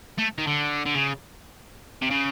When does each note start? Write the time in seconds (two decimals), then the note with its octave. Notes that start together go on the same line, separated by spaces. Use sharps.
0.18 A3
0.38 D#3
0.47 D3
0.86 D3
0.95 C#3
2.02 C3
2.11 C#3